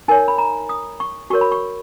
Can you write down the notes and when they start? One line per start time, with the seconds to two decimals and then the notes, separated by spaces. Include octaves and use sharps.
0.08 D#4 A#4 C#5 G#5
0.28 B5
0.38 A#5
0.69 D#6
1.00 C#6
1.30 F#4 A#4 C#5 C#6
1.41 B5
1.52 C#6